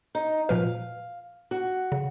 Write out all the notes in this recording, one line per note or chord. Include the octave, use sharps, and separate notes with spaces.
D#4
A#2 F3 B4 F5
F#4
C#3